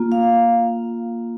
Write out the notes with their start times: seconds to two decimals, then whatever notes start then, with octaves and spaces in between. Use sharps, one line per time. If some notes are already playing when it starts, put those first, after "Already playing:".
Already playing: A#3 F4
0.12 F5